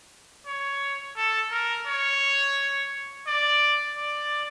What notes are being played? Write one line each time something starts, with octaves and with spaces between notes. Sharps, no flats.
C#5
A4
A#4
C#5
D5
D5